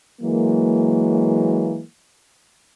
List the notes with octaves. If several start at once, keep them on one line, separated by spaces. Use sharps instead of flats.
E3 F#3 G#3 A#3